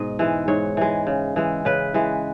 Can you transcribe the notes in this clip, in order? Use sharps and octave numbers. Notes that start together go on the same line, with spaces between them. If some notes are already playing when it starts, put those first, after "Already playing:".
Already playing: G#2 B2 D#5
E3 G#3
G#2 C#5
E3 G#3
C#3
E3 G#3
C#3 B4
E3 G#3